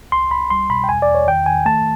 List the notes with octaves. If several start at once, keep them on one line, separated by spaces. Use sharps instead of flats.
C2 C6
C2 B5
G3 C6
B2 B5
G5
E2 G#5
D5
E2
C#5
D#3 G5
D#3 G#5
A3 A5